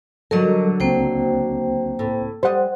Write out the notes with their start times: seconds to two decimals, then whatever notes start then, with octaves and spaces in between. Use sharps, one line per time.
0.31 D3 F#3 G3 A4 A#4 D#5
0.80 C#2 A#3 C4 C5 G5
1.99 A2
2.43 G3 C5 D#5 F#5